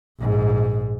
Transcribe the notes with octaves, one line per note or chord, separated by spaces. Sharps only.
A#1 G#2